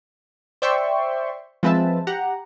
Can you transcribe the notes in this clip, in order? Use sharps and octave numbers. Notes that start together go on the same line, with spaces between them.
C5 D5 E5 G5 C6 C#6
F3 G#3 C4 B4 E5 A5
G4 F#5 A#5